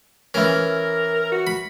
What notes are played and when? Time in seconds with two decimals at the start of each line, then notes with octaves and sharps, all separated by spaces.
0.34 E3 C#4 A#4
1.32 F#4
1.47 B5